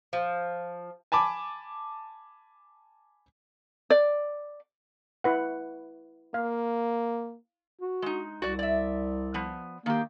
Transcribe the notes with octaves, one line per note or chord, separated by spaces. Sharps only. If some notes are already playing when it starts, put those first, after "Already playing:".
F3
G#5 A5 B5 D6
D5
E4 B4 F#5
A#3 F5
F#4
G#3 D#4
C2 F#4 D5
D5 E5
F3 B3
D#3 A#3 G4